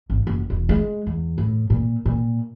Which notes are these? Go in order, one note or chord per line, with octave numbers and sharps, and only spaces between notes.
G#1
F#1
E1
G#3
E2
A2
A#2
A#2